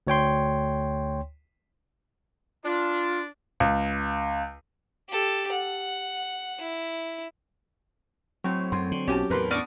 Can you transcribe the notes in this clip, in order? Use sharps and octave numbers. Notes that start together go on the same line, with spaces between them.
D2 C#5 G5 C6
D4 F4
C#2
G4 A4
F#5
E4
A2 F#3 C4
F#2 C6
D3
B1 C#4 F#4 G4 G#5 A5
E2 A2 A#4 B4 C6
B3 D4 D5 C#6 F6 A#6 D#7